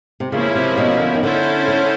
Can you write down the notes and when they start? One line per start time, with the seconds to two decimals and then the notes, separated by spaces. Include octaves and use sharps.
0.20 C3
0.32 C#3 F3 A#3 C#4 E4
0.55 C3
0.78 B2
0.99 D3
1.15 D#3
1.22 D3 C#4 E4 A4 C5
1.68 D3